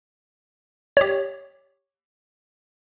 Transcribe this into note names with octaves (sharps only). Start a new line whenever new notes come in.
G4 C#5